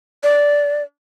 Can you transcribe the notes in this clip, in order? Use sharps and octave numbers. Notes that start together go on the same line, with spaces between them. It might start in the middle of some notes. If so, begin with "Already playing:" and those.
D5